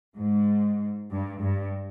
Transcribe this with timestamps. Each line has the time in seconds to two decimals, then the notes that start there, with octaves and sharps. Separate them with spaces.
0.15 G#2
1.10 G2
1.41 G2